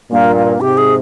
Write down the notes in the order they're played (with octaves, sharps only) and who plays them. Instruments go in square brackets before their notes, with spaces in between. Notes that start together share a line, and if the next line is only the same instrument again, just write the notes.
[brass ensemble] G2 A#2 [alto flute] A#3
[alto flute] A#3
[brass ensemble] G#2 C3 [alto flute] G4
[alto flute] G#4